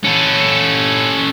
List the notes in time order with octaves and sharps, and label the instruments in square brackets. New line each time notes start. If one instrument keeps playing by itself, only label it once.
[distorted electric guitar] C#4 A4